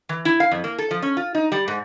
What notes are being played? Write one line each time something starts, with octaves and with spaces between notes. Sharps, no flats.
E3
E4
F5
F2
A#3
A4
F3
C#4
F4
D#4
G3
G#2